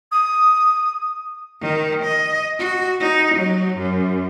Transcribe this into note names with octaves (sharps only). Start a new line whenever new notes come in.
D#6
D#3
D#5
F#4
D#4
F#3
F#2